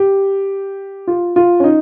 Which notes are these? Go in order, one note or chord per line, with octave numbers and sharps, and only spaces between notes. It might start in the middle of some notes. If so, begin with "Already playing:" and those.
Already playing: G4
F4
F4
C#4
D#4